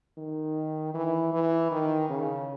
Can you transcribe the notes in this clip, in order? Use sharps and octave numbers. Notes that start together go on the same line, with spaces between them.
D#3
E3
E3
D#3
C#3